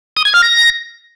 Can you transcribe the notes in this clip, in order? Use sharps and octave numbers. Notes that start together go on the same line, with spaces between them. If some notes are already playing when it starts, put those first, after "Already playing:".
D#6
G#6
F6
A#6